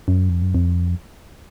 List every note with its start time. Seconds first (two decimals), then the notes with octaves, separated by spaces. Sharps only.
0.08 F#2
0.29 F2
0.42 F#2
0.55 F2